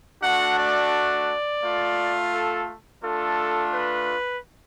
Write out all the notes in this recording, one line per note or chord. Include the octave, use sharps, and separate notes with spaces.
A3 D4 F#4 F#5
D5
A3 F4
A4
A3 D4 F4 A4
B4